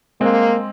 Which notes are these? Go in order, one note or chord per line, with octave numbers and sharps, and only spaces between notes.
G#3 A#3 C4